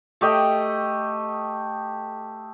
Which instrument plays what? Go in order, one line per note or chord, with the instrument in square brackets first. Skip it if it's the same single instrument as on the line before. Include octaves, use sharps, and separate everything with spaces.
[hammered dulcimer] A3 G4 D#5 G5